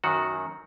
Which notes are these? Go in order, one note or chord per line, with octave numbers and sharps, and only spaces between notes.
F#2 D#3 F#3 F#4